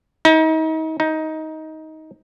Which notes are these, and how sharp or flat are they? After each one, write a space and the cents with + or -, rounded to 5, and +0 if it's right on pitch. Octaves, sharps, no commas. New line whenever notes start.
D#4 +35
D#4 +15